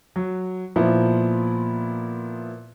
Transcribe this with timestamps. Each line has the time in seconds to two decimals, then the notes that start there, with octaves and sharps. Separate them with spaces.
0.16 F#3
0.76 A#2 F3 B3 E4